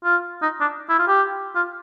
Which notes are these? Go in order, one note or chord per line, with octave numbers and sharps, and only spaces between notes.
F4
D#4
D4
E4
F4
G4
F4